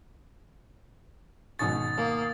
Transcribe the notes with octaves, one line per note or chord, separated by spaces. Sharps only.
G#1 B2 C#6 D#6 A6
A#3